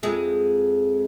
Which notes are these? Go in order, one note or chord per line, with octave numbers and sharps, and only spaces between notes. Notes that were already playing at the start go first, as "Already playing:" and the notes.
F2 G#3 G#4